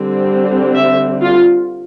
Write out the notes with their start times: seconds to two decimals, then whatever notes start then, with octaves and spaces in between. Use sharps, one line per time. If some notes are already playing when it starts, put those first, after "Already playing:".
Already playing: D3 G3 C4
0.74 E5
1.22 F4